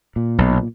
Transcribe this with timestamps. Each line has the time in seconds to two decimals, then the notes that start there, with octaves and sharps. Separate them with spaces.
0.16 A#2
0.38 B1